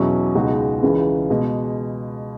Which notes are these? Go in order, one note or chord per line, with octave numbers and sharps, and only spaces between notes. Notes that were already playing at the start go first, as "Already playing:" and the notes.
Already playing: E2 B2 F#3 C#4 E4
C#2 B2 G#3 D#4 F#4
C#2 C#3 E3
B2 G#3